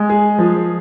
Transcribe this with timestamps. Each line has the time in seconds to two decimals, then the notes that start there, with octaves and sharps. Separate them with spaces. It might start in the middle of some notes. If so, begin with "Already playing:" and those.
Already playing: G#3
0.10 G#4
0.38 F3